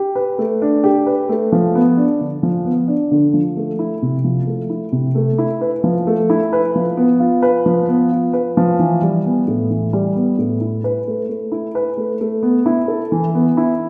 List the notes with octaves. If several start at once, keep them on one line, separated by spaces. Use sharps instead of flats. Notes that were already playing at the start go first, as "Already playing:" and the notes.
Already playing: G4
B4
A3
D4
G4
B4
A3
F3
B3
D4
D3
F3
B3
D4
D3
F3
A3
E4
C3
F3
A3
E4
C3
A3
E4
B4
F3
A3
E4
B4
F3
B3
F4
B4
F3
B3
F4
B4
F3
E3
G3
B3
A2
E3
G3
B3
A2
E4
B4
A3
A3
E4
B4
A3
A3
B3
E4
A4
E3
B3
E4